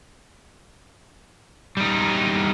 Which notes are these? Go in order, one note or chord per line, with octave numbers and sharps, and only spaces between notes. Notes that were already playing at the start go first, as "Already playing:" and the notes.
G3 D#4